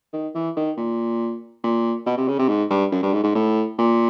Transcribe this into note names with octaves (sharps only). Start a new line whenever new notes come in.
D#3
E3
D#3
A#2
A#2
B2
C3
C#3
C3
G#2
G2
F#2
G2
G#2
G#2
A2
A#2